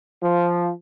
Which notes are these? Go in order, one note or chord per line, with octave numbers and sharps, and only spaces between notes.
F3